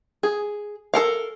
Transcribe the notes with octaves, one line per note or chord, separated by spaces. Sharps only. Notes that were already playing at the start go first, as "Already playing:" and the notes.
G#4
A4 A#4 F5